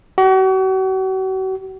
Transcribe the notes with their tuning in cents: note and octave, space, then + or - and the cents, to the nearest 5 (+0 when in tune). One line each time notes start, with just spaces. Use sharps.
F#4 +40